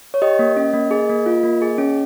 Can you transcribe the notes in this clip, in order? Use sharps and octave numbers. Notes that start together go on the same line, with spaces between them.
C#5
G4 D#5
A#3
C#4
A#3
G#4
A#3
F4
A#3
G#4
C#4